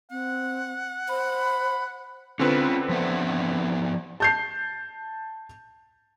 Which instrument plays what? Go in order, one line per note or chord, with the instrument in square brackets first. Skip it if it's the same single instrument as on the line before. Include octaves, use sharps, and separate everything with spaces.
[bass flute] C4 [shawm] F#5
[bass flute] C5 [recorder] B5
[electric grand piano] D3 C4 B4 [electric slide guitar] C#4 F4
[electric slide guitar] F3 B3 E5
[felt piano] A5 G6 C7